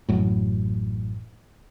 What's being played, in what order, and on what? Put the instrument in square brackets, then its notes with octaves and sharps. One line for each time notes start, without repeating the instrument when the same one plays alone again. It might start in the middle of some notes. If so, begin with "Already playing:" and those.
[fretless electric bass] A1 F#2 A2